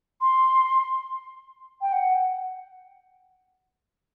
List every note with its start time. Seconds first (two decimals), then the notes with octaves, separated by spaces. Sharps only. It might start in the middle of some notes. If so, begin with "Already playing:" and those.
0.21 C6
1.81 G5
1.93 F#5